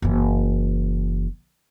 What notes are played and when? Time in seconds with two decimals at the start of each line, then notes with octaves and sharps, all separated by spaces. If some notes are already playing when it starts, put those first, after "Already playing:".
0.02 F#1 E3